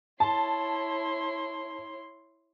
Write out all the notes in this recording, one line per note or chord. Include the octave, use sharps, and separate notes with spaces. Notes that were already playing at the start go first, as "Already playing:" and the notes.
E4 C#5 A5 C6